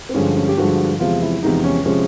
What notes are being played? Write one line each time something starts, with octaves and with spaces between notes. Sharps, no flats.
C4
G2 D3 F3 G#3 C#4
C#4
G4
G2 D3 F3 G#3 F#4
E2 C3 F3 G#3 F4
E4
E2 C3 F3 G#3 D#4
C#4
C3 F3 G#3 C#4